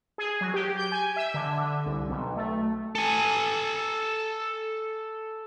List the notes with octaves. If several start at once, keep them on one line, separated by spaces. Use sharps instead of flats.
G#4
F#3
G4
G6
G#5
E5
D3
D3
C2
B1
A3
A4 G#5